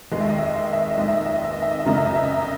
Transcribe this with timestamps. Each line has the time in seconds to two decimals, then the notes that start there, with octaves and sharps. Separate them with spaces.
0.11 D#2 D#3 G#3 D#5
0.21 E5
0.30 D#5
0.38 E5
0.46 D#5
0.56 E5
0.65 D#5
0.73 E5
0.82 D#5
0.91 E5
0.98 D#2 D#3 G#3 D#5
1.09 E5
1.17 D#5
1.26 E5
1.35 D#5
1.44 E5
1.53 D#5
1.62 E5
1.71 D#5
1.80 E5
1.85 F#2 C#3 F#3 D#5
1.97 E5
2.06 D#5
2.15 E5
2.25 D#5
2.34 E5
2.42 D#5